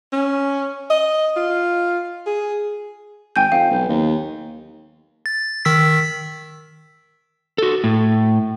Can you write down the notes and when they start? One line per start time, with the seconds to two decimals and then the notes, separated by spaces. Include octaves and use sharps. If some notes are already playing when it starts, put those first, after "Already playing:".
0.13 C#4
0.90 D#5
1.36 F4
2.26 G#4
3.36 G#1 G5 G#5 G6
3.52 F2 F5
3.71 B1
3.89 D#2
5.26 A6
5.65 D#3 E6 B6
7.58 F#4 A4
7.84 A2